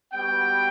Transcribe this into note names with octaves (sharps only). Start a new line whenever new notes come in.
G3 B3 F#4 G5